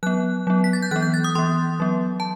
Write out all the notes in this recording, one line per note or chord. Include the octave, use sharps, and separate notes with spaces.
F#3 B3 F#6
F#3 B3
B6
A6
G6
E3 B3 F#6
G6
A6
D#6
E3 B3 C6
F#3 B3
A5